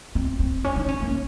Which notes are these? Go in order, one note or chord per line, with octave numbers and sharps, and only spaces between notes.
C4
C4
C#4
D#4
C#4
A#3